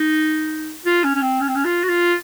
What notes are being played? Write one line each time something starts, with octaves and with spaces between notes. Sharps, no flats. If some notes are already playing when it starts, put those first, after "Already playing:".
Already playing: D#4
F4
C#4
C#4
C4
C#4
C4
C#4
F4
F#4
F4